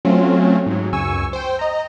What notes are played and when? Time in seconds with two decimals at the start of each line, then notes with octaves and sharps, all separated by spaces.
0.05 F#3 A3 C4 C#4 F4
0.66 G#2 F#3
0.92 C#2 F#2 G#5 C#6 E6
1.33 C5 G5
1.59 D#5 A#5